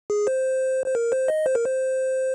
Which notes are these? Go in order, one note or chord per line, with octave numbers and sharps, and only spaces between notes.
G#4
C5
C5
A#4
C5
D#5
C5
A#4
C5